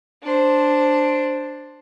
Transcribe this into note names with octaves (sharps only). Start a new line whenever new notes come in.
D4 C5